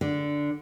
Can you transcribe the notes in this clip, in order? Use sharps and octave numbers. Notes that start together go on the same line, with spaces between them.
D3